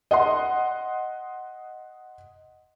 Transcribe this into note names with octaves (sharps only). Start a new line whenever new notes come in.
D#5 F#5 C6